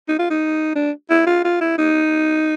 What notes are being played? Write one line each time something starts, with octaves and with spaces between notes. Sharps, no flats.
D#4
F4
D#4
D4
E4
F4
F4
E4
D#4